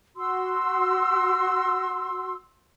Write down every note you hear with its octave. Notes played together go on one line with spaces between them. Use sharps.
F#4 C6 E6